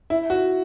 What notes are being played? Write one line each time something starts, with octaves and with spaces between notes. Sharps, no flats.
E4
F#4